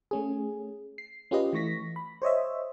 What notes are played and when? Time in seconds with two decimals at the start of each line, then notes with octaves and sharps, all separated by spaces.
0.11 A3 C#4 G#4
0.98 C7
1.31 C#4 F4 G4 B4 D#5
1.53 E3 A3 C#6 A#6 B6
1.96 B5
2.22 C5 C#5 D#5 E5